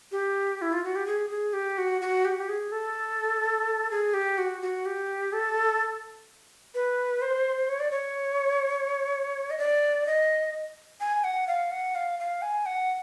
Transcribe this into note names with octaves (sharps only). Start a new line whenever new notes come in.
G4
E4
F4
F#4
G4
G#4
G#4
G4
F#4
F#4
G4
F#4
G4
G#4
A4
G#4
G4
F#4
F#4
G4
A4
B4
C5
C#5
D5
C#5
D#5
D5
D#5
G#5
F#5
F5
F#5
F5
F5
G#5
F#5